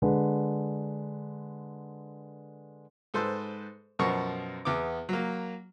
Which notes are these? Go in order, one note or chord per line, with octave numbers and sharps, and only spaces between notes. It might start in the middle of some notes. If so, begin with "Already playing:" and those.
D3 G#3 D4 B4
G#2 A4 B4 C5
F#2 B2 F3 A#4 C#6
E2 B3 D6
F#3 A#3